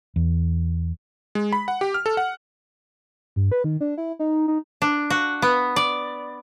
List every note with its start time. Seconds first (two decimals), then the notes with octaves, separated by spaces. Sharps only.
0.16 E2
1.35 G#3
1.53 B5
1.68 F#5
1.81 G4
1.94 F6
2.06 A4
2.17 F#5
3.36 G2
3.52 B4
3.64 D#3
3.81 D4
3.98 E4
4.19 D#4
4.48 D#4
4.82 D4
5.10 F#4
5.42 B3
5.76 D5